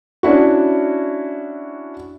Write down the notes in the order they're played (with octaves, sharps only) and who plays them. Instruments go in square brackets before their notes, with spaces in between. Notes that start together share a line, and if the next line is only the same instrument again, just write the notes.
[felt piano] C#4 D4 E4 F#4